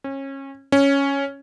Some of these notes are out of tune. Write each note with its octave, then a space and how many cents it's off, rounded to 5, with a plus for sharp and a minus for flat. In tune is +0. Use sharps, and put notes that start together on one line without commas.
C#4 -30
C#4 +0